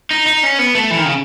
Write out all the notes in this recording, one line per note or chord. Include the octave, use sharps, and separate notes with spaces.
D#4
D#4
C#4
B3
A3
E3
D#3
C#3